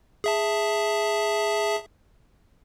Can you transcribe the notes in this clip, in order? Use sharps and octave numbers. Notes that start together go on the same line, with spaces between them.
G#4 E5 A5